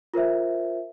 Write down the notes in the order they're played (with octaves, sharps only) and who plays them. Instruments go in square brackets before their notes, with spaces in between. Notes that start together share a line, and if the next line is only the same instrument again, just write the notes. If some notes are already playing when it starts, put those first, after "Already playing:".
[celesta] F4 A#4 C5 E5